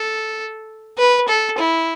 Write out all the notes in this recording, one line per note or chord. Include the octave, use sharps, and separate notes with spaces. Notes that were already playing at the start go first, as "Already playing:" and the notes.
Already playing: A4
B4
A4
E4